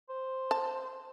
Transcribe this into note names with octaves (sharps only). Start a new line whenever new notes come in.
C5
A5